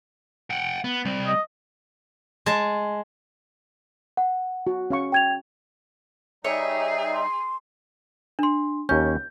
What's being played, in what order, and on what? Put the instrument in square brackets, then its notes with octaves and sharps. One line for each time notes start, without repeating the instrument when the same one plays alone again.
[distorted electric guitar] F#5 G5
B3
G3 C4
[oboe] D#5
[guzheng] G#3 A5
[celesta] F#5
[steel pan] F#4
C#4 F5 C#6
[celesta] G5 G#6 F7
[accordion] G3 D#4 [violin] G#4 [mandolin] C#5 E5
[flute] C6
[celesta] D4 C6
[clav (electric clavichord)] D#2 C#4 [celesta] G6